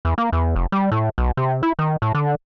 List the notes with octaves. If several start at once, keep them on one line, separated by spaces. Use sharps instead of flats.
E2
A#3
E2
F1
G3
A2
B1
C3
E4
D#3
A2
D3